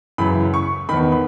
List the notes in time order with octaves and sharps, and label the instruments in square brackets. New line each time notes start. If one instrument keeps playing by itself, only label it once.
[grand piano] F#2 C#3 E3 B5
C#6
E2 D#3 B5
B5